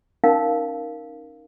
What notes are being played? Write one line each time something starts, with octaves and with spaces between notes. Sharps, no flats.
C#4 D#4 A#4 F5 A5